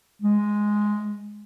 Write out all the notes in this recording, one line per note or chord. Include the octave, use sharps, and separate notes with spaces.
G#3